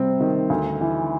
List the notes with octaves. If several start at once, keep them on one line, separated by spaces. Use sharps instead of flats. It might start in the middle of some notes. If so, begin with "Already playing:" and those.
Already playing: C3 G3 C4
D#3
D2
E3